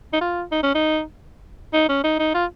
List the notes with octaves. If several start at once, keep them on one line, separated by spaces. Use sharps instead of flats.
D#4
F4
D#4
C#4
D#4
D#4
C#4
D#4
D#4
F4